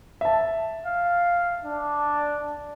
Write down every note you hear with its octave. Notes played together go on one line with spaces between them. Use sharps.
E5 A5
F5
D4